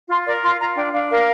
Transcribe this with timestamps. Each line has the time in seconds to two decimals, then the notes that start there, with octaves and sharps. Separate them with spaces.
0.10 F4 C6
0.27 A#4 D5
0.43 F4 C6
0.60 F4 A#5
0.77 D4 G5
0.93 D4 F5
1.10 A#4 F5